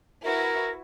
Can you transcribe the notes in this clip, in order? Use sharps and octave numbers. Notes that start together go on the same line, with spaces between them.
E4 F#4 A#4 B4